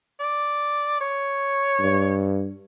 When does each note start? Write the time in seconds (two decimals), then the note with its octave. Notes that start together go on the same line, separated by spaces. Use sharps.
0.20 D5
1.01 C#5
1.80 G2